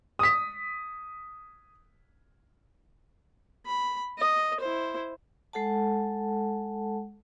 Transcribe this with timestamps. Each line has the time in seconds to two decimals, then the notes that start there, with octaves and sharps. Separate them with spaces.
0.19 D#6 B6
3.66 B5
4.18 D#5
4.60 E4 C5
5.53 G#3 A4 F#5 A5